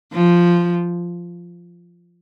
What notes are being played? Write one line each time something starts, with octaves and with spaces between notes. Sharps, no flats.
F3